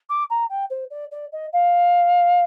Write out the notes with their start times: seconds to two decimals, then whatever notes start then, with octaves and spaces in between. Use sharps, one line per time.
0.09 D6
0.30 A#5
0.49 G5
0.70 C5
0.90 D5
1.11 D5
1.32 D#5
1.52 F5